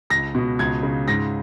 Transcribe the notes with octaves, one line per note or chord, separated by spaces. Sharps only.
C#2 A#6
B2
C#2 G#6
C#3
G#2 A#6